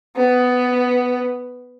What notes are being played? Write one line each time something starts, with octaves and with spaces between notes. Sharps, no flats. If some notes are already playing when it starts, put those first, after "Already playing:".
B3